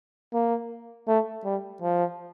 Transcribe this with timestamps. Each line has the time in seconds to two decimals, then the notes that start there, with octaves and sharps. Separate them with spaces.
0.33 A#3
1.08 A3
1.45 G3
1.82 F3